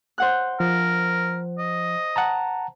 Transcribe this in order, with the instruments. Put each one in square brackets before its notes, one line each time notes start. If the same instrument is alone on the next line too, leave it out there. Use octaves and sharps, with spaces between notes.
[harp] C5 F#5 F#6
[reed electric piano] F3 [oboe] A#4
[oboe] D#5
[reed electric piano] F#5 A5 A#5